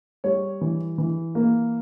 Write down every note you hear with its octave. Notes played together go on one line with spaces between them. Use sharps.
G3 C#5
E3
E3
A#3